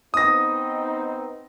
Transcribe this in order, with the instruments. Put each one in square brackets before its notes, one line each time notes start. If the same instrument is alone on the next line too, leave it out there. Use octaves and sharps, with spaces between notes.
[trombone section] B3 C4 D#4 [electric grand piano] D#6 A#6